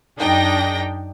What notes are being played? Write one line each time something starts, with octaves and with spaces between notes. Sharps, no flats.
F#2 D4 D#4 G#4 G5 A#6